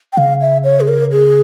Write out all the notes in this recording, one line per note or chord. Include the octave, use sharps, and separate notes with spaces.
G5
C#3 F5
E5
C#5
G#4
A#4
G#4